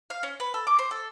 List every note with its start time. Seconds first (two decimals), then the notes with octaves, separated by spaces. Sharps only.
0.10 F5
0.23 C#4
0.40 B4
0.54 A4
0.67 D6
0.79 C5
0.91 A4